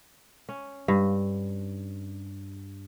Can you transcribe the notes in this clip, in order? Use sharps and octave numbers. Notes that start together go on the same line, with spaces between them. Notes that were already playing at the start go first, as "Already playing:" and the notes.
C#4
G2